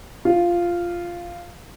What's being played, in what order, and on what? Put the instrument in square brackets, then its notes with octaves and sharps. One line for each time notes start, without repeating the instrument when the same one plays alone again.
[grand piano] F4